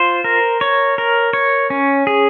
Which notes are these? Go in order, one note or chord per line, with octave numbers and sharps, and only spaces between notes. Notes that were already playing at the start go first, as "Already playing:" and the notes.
Already playing: F4 C5
A#4
C#5
A#4
C#5
C#4
G#4